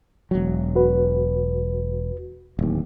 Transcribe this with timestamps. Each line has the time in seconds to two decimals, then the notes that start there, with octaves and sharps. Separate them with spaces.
0.31 E1 F#3
0.75 F#4 B4
2.59 D1 D#2